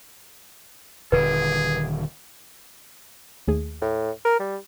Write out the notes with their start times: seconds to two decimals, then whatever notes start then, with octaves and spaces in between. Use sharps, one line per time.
1.12 D#1 D3 D#3 G#4 B4
3.48 D#2 A3 G#4
3.81 A2
4.25 A#4
4.39 G3